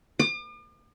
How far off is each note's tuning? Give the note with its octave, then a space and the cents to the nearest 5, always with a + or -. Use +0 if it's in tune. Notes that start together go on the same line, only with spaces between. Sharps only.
D6 +45